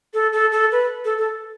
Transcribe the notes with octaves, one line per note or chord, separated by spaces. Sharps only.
A4
A4
A4
B4
A4
A4